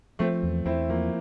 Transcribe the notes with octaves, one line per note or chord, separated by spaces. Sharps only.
F3 A3 C4
E2
E2 C4 E4
F3 A#3